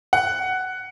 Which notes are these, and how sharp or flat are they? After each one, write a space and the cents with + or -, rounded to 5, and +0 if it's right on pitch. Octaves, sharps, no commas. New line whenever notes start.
F#5 +10